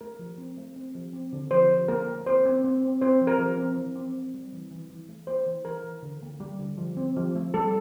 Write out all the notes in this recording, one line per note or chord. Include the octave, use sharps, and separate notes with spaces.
A3 A#4
F3
C4
A3
C4
F3
C4
D3
F3 C5
F3
A#3 A#4
A#3
C4 C5
C4
C4
C4
C4 C5
F3
A#4
F3
C4
E3
C4
C4
G3
E3
E3
E3
A3
A#3 C5
E3
E3 A#4
E3
D3
A#3
G3
D3
F3
C4
F3
A3
G3 A4